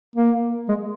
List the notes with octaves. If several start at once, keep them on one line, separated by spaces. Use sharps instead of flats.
A#3
G#3